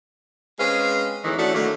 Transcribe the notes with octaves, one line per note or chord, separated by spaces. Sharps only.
G#3 C4 C#4 B4 F5
E2 A2 D#3 E3
A3 C#4 D4 E4 F#4
D3 D#3 F#3 A3 A#3